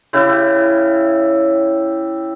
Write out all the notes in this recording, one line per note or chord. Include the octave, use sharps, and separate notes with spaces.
C#3 E4 G4